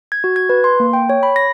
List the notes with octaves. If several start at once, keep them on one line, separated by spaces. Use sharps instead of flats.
G#6
F#4
G#6
B4
C6
A#3
G5
C#5
B5
A#6